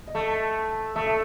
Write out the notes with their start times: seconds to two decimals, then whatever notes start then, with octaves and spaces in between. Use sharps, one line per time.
0.07 D#5
0.15 A3 E5
0.96 A3 E5
1.07 E5